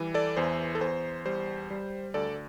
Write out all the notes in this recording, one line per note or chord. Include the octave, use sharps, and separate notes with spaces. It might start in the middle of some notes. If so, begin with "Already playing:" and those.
Already playing: E3 G3
A4 D5
E2 C5
A4
E2 C5
G3 C5
G3
D2 A4 D5